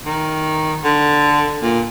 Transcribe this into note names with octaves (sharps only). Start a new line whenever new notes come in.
D#3
D3
A#2